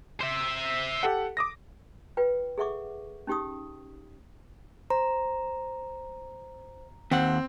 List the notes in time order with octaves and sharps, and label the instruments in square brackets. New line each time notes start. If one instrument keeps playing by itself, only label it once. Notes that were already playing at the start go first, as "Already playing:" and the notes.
[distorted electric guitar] C5 E5
[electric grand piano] G4 A4 F#5
D6 D#6 A#6
[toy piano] F4 B4 G5
G#4 A4 E5 F#5 C#6 D6
C#4 D#4 G4 G5 C#6 D#6
[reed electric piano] C5 [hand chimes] A#5
[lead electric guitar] D#2 F#5 [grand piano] C4